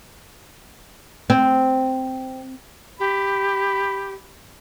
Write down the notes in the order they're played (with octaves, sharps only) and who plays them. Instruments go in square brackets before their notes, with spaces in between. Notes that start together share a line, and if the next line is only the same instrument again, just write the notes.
[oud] C4
[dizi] G4 [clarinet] B5